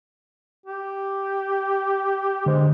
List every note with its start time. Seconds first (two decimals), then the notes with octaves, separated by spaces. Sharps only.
0.66 G4
2.46 D3 G#3 C5